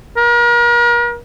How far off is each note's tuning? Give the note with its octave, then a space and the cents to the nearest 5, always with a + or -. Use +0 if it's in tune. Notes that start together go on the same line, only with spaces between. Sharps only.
A#4 +40